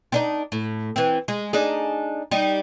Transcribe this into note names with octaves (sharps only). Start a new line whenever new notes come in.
C4 D4 D#4
A2
E3 C4
G#3
D4 D#4 G#4
G3 D#4